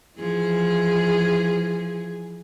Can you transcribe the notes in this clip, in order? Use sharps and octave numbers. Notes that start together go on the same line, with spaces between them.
E3 F3 G#4